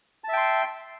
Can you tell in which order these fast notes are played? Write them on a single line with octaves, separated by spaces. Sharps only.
A5 E5 G5 C6